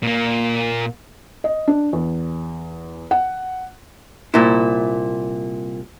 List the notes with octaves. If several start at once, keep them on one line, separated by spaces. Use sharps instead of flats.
A#2 A#3
D#5
D4
E2
F#5
C2 A#2 E4